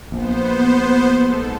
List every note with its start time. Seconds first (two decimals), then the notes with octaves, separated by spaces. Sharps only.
0.12 A#1 B3 C5
1.23 G#2 A4